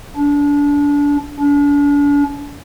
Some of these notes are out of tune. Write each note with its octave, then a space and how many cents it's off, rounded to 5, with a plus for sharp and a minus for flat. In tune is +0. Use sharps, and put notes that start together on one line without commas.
D4 -30
D4 -40